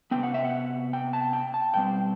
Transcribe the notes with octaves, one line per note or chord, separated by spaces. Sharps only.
C3 E3 B3 G5
F#5
E5
F#5
G5
A5
G5
A5
B2 G3 C4 G5